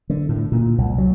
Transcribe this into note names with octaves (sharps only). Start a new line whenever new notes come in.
D3
A2
A#2
C2
F#3